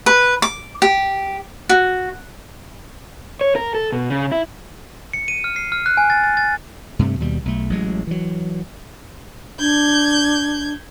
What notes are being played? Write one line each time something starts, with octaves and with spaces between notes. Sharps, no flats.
B4
D6
G4
F#4
C#5
A#4
A4
B2
C#3
E4
C#7
D#7
F6
C7
F6
F#6
G#5
A6
A6
A6
G2 C3 A3
D#2 B2 G3
B1 A3
A1 F#3 G#3
E3 F#3
D4 G6 G#6